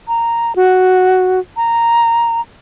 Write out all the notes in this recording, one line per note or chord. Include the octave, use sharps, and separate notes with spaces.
A#5
F#4
A#5